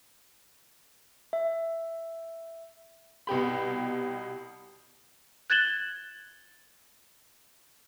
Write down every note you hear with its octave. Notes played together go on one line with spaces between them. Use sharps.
E5
C2 B2 G4 B5
F#6 G#6 A6 E7 F#7 G7